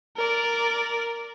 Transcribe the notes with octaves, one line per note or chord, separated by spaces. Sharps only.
A#4 D5